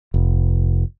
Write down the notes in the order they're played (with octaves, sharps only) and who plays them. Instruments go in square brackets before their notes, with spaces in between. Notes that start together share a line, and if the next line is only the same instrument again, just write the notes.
[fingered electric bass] F1